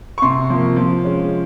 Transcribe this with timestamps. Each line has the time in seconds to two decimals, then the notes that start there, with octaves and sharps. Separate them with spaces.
0.18 C#6
0.22 C3 C6
0.50 F3 A#3
0.76 F3
1.04 G#3 C#4